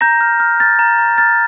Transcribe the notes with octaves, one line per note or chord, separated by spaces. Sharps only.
A#5 G6 A#6
F6
F6
F6 A6
A#5
A#5
F6 A6